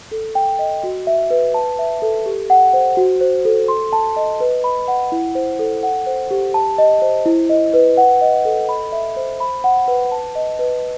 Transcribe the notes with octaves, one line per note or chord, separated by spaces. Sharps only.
A4
G5
D#5
F#4
E5
B4
A5
E5
A4
G4
F#5
C5
F#4
C5
A4
C6
A5
D#5
B4
B5
F#5
E4
C5
A4
F#5
C5
G4
A5
D#5
C5
E4
D#5
B4
F#5
D#5
A4
B5
E5
C5
B5
F#5
B4
A5
D#5
B4